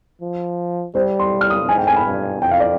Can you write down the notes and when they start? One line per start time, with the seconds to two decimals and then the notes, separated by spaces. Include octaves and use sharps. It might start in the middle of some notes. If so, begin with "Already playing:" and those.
0.21 F3
0.95 G3 C5
1.20 C6
1.41 F6
1.50 D#6
1.69 G#2 G#5
1.78 G5
1.87 G#5
1.96 B5
2.05 G2
2.42 F2 G5
2.51 F5
2.60 D5